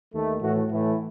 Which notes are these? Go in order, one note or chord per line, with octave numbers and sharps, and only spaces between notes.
D#2 D#3 A3
A2 E3 A3 F#4
A2 E3 A3 E4